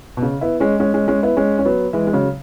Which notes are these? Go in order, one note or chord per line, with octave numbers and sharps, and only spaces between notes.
B2
C#3
B3 E4
G#3 C#4
G#3 C#4
G#3 C#4
G#3 C#4
B3 E4
G#3 C#4
C#4
F#3 B3
E3 G#3
G#3
C#3 F#3